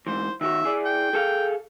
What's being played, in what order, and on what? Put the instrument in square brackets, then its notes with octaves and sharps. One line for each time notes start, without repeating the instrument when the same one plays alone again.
[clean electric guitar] G#2 E3 [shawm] C5
[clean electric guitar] D#3 F#4 C#5 [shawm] E5
[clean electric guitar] E4 G#4 D5
[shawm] G5
[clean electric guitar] G#4 A4 F5